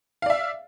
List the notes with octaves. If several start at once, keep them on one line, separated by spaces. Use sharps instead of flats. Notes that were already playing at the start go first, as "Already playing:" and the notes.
D5 E5 F5